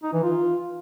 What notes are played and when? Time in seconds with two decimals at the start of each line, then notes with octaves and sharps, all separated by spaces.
0.03 D#4
0.13 E3
0.23 F4